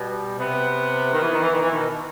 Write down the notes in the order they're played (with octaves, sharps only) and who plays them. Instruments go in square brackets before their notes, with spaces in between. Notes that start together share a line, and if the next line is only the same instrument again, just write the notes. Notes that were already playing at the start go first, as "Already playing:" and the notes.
Already playing: [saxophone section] B2 [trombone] G3
[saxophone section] C3 [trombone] B3
[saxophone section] D#3
E3
D#3
E3
D#3
E3
B2 D#3